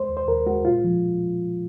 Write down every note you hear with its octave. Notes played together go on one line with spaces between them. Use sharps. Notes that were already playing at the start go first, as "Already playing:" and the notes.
Already playing: G#3 C5
D#2
C5
D#2 A#4
G#3 F#4
A#2 F4
F3